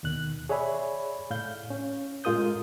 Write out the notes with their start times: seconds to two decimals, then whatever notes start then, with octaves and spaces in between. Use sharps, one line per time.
0.03 D#2 B2 D#3 F#6
0.49 G#4 C#5 D5 E5 G#5 B5
1.30 A2 F5 G6
1.70 C#4
2.24 A2 G#3 F4 A#4 D#6 G6